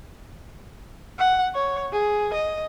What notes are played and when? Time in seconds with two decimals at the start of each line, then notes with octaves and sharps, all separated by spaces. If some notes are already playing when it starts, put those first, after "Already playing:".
1.19 F#5
1.55 C#5
1.92 G#4
2.34 D#5